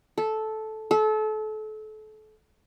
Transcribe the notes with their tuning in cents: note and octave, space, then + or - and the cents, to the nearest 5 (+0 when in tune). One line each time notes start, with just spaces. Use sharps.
A4 -10
A4 -30